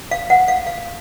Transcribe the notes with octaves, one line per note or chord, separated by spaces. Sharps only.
F5
F#5
F5
F5